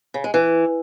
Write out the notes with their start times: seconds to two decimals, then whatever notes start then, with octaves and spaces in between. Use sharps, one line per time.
0.14 C#3
0.24 G#3
0.34 E3